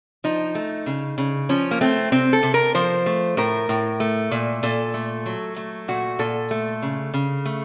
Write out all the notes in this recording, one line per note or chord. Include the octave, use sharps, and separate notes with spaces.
F3 D#4
A3
C#3
C#3
F3 C#4
A#3
A3 C4
C3 C4
A4
C3
A#4
F3 C5
A3
A2 A#4
A2
A3
A#2
A#2 A4
A3
F#3
A3
A#2 F#4
A#2 A4
A3
C#3
C#3
A3